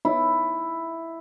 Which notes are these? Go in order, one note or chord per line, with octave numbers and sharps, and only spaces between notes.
E4